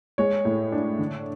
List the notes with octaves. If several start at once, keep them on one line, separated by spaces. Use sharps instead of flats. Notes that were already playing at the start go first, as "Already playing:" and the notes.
G#3 C#5
A2
D4
D3